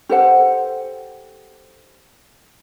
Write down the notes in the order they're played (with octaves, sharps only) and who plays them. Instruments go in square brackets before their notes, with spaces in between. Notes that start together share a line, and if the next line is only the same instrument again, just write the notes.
[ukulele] G4 A4 C5 F#5